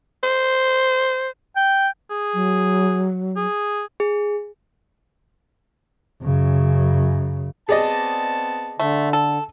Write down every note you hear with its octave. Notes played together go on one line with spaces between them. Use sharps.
C5
G5
G#4
F#3
G#4
G#4
F#2 C#3
B3 C4 G#4 D5 D#5 A5
D3 A3
A4